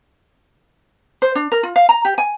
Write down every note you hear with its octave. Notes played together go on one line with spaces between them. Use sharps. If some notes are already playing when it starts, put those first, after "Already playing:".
C5
D4
A#4
F4
F5
A#5
G4
G#5